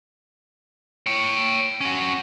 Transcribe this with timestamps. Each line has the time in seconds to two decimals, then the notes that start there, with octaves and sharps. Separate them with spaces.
1.06 C#5 G5
1.81 C#4 F#4